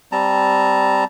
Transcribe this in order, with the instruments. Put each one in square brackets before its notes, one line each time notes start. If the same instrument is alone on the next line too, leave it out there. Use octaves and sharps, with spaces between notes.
[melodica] G3 C4 A5 A#5